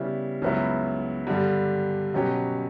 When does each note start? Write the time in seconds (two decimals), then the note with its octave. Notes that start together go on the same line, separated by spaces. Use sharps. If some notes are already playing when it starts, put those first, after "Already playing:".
Already playing: C#3 G3 B3 E4
0.42 C#2 C#3 F#3 B3 E4
1.27 G2 D3 G3
2.14 B2 F#3 C#4 G4